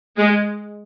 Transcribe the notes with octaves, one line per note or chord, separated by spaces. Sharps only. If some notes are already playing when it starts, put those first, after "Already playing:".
G#3